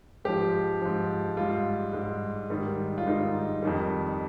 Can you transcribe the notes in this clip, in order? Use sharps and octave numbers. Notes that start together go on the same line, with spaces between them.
G#2 F3 G4
G#2 F3
G#2 G3 F4
G#2 G3
G#2 D#3 G3
F4
G#2 D#3 G3 D#4
F2 D#3 G3